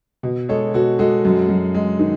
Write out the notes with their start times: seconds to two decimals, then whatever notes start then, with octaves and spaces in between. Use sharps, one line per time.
0.23 B2
0.49 G#3 A4 C#5
0.74 B2 F#4 A4
0.99 G#3 F#4 A4
1.25 F#2
1.49 F#2
1.75 G#3
1.99 D#3